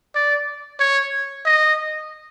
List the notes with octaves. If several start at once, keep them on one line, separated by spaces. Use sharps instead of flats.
D5
C#5
D#5